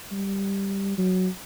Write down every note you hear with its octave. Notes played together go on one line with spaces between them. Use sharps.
G3
F#3